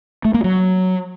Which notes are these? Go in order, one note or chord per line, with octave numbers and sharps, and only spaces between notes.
A3
A#3
F#3